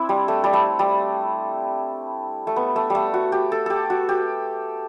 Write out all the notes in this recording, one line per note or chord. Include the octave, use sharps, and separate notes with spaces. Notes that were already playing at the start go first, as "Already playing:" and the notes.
Already playing: C4 D4 E4
G3
A3
G3
A3
G3
A3
B3
A3
G3 A3
F#4
G4
A4
G4 A4
F#4
G4